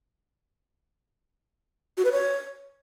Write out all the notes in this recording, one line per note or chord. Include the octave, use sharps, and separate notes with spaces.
F#4
B4
C#5